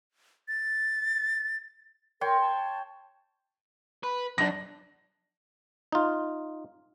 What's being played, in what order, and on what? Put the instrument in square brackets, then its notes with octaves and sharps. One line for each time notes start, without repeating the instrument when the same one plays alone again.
[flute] A6
[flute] A#4 [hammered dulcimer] C#5 G5 C6
[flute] A5
[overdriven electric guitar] B4
[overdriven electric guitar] F#2 [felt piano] D4 A#6
[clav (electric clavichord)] D#4 F4